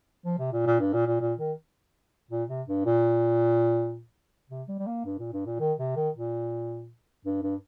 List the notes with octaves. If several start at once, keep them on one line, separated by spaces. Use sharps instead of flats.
F3
C3
A#2
A#2
G2
A#2
A#2
A#2
D#3
A#2
C3
G2
A#2
C3
G3
G3
A#3
G2
A#2
G2
A#2
D#3
C3
D#3
A#2
G2
G2